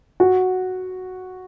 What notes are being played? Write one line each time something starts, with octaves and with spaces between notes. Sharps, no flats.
F#4